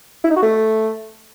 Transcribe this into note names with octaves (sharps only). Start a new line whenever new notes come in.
E4
D#4
F#4
A3